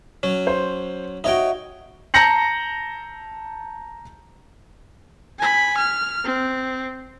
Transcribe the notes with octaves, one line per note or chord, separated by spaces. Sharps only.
F#3 C#4
C5
D#4 F#4 C#5 D#5 E5 G5
A5 A#5 G6 A#6 C#7 F#7
G#5 B5
F6
C4